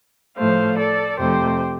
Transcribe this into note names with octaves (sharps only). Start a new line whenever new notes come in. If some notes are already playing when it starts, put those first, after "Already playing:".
A2 F3 A3 C5 F5
A4 D5
F2 C3 A3 G4 C5